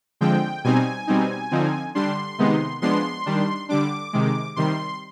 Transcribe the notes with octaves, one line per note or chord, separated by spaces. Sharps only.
D3 F3 G#3 C4 G5
B2 G3 C4 D#4 G#5
B2 G3 C4 D#4
D3 F3 C4 D#4
D3 G3 D4 C6
C3 D#3 G#3 B3 D#4
F3 G#3 B3 D4 C6
D#3 G3 D4
D3 G3 D4 D6
C3 D#3 G#3
C3 D#3 G3 C6